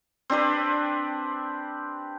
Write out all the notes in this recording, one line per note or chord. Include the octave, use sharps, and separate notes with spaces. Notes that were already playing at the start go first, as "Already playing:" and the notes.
C4 D4 G4 B4